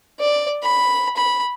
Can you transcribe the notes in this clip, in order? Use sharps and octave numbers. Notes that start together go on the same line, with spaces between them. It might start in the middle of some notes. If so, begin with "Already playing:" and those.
D5
B5
B5